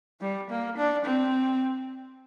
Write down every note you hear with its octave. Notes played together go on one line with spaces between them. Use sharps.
G3
A#3
D4
C4